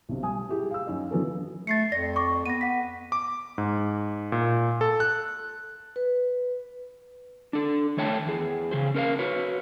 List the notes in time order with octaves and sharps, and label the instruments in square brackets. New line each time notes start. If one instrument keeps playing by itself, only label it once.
[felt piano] B1 C3
G3 G#5 D#6
E4 G4 G#4
F5 E6
F#2 C#4 D#4
D3 E3 F#3 B3 C#4 A4
[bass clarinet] A3 [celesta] A6 C7 C#7
[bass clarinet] F2 [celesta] D5 A#6
[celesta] C#6 D6
[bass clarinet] B3 [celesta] A#6 D#7
[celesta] F#5 B6
[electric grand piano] D6
G#2
A#2
A4
F#6
[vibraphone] B4
[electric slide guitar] D4 A4
D#3 A3 C#5 G5 A5
E2 G#4
C#3 G#4 C5
C#4 A#4 D#5 F5
F#4 B4 C#5